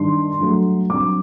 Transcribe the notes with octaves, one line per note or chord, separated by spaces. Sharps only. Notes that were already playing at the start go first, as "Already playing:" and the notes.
Already playing: G2 D#3 G3 D4 C6
G2 F#3 A3
G2 F#3 C4 D6